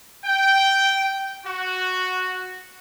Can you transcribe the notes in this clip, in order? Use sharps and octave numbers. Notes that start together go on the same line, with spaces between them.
G5
F#4